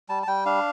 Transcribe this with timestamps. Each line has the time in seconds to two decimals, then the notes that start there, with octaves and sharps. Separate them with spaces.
0.09 G3 A5
0.23 A5
0.27 G3 G5
0.46 D4 F5